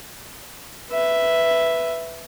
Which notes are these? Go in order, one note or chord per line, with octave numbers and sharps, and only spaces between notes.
B4 E5